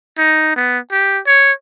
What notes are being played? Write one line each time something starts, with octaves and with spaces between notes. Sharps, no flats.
D#4
B3
G4
C#5